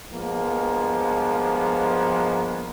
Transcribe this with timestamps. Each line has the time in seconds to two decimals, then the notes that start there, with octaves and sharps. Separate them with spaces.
0.13 G2 F3 G#3 A#3 B3